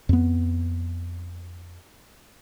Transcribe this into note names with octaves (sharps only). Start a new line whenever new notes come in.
F2 B3